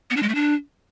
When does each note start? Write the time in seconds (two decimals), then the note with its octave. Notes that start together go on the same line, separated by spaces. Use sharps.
0.10 B3
0.16 D4
0.23 G#3
0.29 A3
0.35 D4